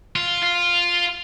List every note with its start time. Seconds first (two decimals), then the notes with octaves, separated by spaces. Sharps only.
0.16 F4
0.43 F4